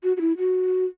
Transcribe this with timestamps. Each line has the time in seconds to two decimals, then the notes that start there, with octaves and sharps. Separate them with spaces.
0.03 F#4
0.17 F#4
0.21 E4
0.38 F#4